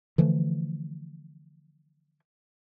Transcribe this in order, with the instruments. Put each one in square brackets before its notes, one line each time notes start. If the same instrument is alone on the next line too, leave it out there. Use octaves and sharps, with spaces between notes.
[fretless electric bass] D3 E3 F3 A3